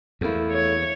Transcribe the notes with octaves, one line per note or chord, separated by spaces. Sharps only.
E2 A3 A#3 E4
C#5